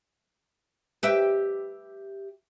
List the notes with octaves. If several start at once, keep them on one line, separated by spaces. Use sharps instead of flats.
G4 B4 E5